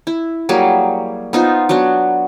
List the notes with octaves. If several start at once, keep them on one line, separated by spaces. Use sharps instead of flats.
E4
F#3 G3 A#3 G#4
B3 D#4 F4 C5
F#3 B3 D4 F#4